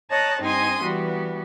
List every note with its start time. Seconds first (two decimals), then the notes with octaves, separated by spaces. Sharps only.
0.10 C#5 D#5 A5 A#5 F#6
0.41 G2 C4 D#4 G#5 C6 D#6
0.82 E3 G3 B3 F#4